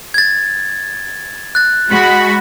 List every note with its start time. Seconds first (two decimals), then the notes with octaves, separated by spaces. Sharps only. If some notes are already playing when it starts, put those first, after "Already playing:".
0.14 G#6 A6
1.55 F#6 A6
1.90 G#3 F#4 B5